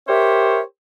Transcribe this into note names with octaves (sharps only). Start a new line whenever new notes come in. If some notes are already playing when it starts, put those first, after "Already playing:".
G4 A#4 C5 C#5 E5